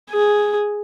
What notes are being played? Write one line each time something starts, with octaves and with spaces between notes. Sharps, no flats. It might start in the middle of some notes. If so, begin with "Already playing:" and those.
G#4